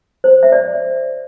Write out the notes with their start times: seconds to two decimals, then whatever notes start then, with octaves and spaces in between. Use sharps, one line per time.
0.24 C5
0.43 E5
0.52 D5